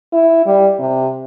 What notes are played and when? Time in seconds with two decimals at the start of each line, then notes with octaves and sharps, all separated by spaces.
0.13 E4
0.46 G3
0.79 C3